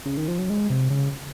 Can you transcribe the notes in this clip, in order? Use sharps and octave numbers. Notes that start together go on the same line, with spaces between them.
C#3
D#3
F3
F#3
G#3
C3
C#3